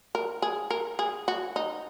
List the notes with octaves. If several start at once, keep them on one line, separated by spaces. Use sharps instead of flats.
A#4
G#4
A#4
G#4
F#4
D#4